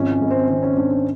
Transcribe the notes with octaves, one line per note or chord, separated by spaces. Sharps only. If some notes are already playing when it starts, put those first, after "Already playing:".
Already playing: G#1 F3 C#4
C#4
G#1
C4
D#3 C4
C#4
G#1 D4
C#4